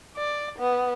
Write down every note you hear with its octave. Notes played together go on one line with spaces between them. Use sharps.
D5
B3